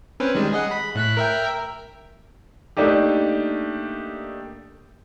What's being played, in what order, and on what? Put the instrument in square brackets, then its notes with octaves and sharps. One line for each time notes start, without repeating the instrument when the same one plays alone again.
[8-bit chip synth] C4 C#4 B4
D#3 G3 G#3
G#4 D#5 F#5
B5
A2 F#6 B6
A#4 E5 G5
[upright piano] A3 A#3 D4 D#4 G4